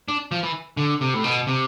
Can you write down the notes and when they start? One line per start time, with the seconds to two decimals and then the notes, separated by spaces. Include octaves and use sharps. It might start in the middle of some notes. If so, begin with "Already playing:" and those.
0.08 D4
0.32 F3
0.43 E3
0.77 D3
1.01 C3
1.14 A2
1.24 B2
1.47 C3